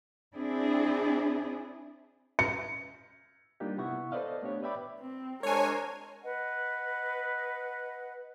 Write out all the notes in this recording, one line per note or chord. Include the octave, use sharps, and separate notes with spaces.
C4 D4 E4 G#4
C#7
G3 A#3 D4 D#4 F4 G4
C3 B3 E4 E5 F#5 C#6
A4 B4 C5 D5 D#5 F5
A3 B3 D4 G4 C#5
B4 D5 E5 G5 B5 D6
C4
G#3 D4 A#4 C5 C#5 G#5
B4 D#5 F#5